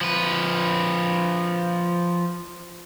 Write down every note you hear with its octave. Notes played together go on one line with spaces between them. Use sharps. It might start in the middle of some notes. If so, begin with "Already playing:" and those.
F3 B4